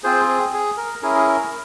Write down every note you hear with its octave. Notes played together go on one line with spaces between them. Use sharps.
C4 F4 G#4 C5
G#4
G#4
A#4
C#4 E4 G#4 A#4
G#4
A#4